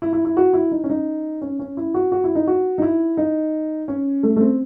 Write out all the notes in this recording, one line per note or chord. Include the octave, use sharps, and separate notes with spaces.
E4
E4
E4
F#4
E4
D#4
C#4
D#4
C#4
C#4
E4
F#4
F#4
E4
D#4
F#4
D#4
E4
D#4
C#4
A3
A3
C4